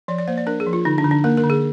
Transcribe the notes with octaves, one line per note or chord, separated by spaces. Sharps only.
F3 D5
D5
A#3 C5
D5
D4 A#4
G#4
F3
F4
D3 D#4
D4
D3
D4
A#3 A#4
A#4
D3
G#4